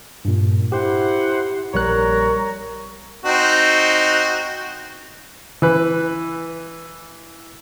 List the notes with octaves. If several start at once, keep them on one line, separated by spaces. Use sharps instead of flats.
G2 A#2
E4 G4 C5 F#5
A#1 G3 A#4 C#5 A#5 F#6
C4 D#4 F#4
E3 B4